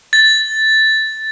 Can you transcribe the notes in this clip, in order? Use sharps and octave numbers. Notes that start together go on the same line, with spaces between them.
A6